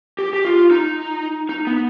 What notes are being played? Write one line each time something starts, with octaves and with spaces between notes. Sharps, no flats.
G4
G4
F4
D#4
D#4
B3